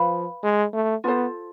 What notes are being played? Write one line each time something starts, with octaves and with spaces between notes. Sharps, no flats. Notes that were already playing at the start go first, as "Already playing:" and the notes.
Already playing: F3 B4 F5 B5
G#3
A3
B3 F4 A4 C5